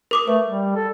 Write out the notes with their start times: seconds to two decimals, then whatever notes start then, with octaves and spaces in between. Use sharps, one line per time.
0.11 A#4 D6 D#6
0.28 A3 B4
0.47 G3
0.76 A4